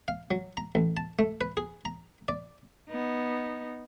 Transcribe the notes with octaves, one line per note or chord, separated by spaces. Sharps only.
F5
F#3
A#5
A1
A5
A3
B4
G#4
A#5
D5
B3 D#4